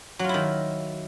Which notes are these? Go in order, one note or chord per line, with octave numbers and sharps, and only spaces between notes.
D#3 F#3 E4 F4